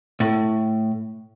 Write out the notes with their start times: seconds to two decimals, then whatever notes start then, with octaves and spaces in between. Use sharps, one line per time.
0.20 A2